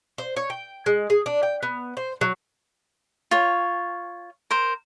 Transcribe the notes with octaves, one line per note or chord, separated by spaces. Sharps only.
C5
C#5
G5
G#3
G#4
D4
G5
B3
C5
F#3
F4 C#5
A#4 C5